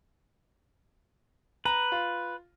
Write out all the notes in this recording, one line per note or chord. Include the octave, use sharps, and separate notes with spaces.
B4 A#5
F4